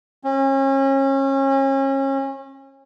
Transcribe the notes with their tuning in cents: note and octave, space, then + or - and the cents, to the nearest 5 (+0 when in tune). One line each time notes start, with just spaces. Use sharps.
C#4 -35